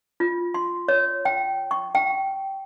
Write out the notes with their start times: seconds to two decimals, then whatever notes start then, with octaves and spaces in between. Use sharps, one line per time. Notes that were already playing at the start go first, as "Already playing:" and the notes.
0.20 F4
0.54 C6
0.88 C#5
1.25 G5
1.71 C#6
1.95 G5